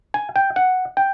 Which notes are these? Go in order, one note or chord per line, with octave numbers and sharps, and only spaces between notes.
G#5
G5
F#5
G5